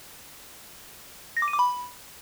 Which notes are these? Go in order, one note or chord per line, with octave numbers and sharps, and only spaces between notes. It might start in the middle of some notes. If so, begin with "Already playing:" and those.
A#6
D6
D#7
D6
B5